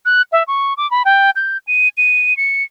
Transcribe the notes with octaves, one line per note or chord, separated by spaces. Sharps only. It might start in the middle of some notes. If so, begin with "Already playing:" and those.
F#6
E5
C#6
D6
B5
G5
G6
D#7
D#7
C#7